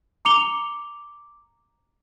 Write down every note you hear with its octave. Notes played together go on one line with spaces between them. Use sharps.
A#5 D6 C#7 F7 G7